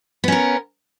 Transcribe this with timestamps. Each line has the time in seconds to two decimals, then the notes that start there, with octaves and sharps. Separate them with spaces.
0.24 B3
0.28 C#4
0.32 A#4